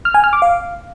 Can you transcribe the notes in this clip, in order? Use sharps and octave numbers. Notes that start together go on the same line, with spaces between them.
F6
G#5
F6
D6
F5